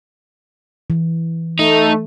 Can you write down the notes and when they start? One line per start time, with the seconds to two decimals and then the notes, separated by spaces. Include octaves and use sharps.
0.90 E3
1.59 A3 D#4